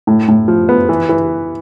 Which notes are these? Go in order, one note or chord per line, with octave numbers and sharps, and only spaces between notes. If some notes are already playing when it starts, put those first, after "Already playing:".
A2
A2
F3
B3
E3
E3